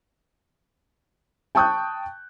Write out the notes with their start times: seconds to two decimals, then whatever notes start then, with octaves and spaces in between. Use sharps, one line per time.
1.55 G5 A5 C#6 D#6 F#6 G6